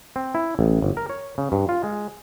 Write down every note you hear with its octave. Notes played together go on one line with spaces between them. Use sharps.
C4
E4
A1
G1
A#4
C#5
C#3
G2
F4
G#3